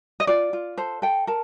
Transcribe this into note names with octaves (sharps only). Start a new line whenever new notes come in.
D#5
F4 D5
F4
A4 C5
A4 G5
A#4 A5